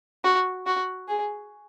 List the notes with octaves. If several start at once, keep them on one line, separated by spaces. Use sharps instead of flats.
F#4
F#4
G#4